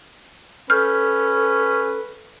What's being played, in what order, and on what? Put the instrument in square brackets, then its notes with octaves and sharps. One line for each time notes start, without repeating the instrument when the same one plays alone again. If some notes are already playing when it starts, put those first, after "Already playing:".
[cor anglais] C#4 [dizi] A4 [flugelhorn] B4 [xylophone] F6 G6